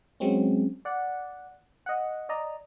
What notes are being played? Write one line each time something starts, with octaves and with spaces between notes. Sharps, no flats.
F#3 G#3 C4 C#4
D5 F#5
D#5 F#5
D5 D#5 A#5